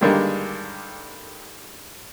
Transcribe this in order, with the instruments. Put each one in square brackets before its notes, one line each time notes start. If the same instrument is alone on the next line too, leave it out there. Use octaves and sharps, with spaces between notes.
[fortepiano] G2 D3 D#3 G3 G#3 A#3